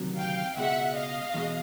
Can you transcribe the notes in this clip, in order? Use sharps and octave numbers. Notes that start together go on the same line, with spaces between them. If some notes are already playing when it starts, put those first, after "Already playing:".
Already playing: D2 C3 D#3 F#3
F5 G5
C#2 B2 G#3 E5 F#5
D#5 F5
E2 B2 G#3